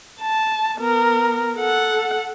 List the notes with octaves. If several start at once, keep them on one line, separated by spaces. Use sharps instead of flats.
A5
B3 A#4
A4 F#5